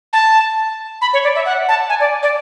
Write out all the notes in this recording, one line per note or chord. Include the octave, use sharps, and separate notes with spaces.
A5
B5
C#5
D5
E5
F#5
A5
G#5
D5
D5